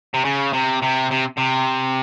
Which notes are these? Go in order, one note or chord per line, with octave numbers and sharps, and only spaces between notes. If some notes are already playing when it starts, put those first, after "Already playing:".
C3
C#3
C3
C3
C3
C3